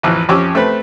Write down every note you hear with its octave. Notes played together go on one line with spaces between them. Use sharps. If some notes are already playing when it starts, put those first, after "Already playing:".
A1 F2 E3
F2 C#4 G4 D6 E6
A3 C4 B4